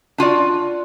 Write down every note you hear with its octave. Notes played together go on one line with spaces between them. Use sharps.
D4 F4 F#4 D5